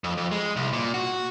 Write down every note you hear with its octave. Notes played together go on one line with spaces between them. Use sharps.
F2
F2
G#3
C2
A#2
F#4